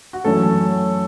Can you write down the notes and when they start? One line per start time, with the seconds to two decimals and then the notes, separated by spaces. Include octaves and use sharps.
0.13 F#4
0.24 F#2 E3 A3 C#4 A4